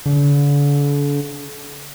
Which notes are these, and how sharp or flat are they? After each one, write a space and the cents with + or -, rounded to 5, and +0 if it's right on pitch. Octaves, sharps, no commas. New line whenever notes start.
D3 -40